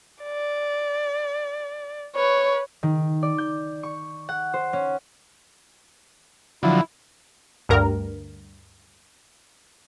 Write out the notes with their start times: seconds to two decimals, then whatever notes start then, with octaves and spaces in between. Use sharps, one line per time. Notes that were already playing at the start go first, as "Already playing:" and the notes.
0.23 D5
2.16 B4 C#5
2.83 D#3
3.23 D5
3.38 G6
3.83 C#6
4.29 F#5
4.53 C5
4.73 C#4
6.63 D3 F3 F#3 E4
7.69 D2 G2 A#4